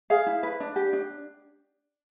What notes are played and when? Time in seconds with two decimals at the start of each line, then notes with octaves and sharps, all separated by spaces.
0.10 G#4 F5
0.27 E4
0.43 B4
0.60 D4
0.76 G4
0.93 D4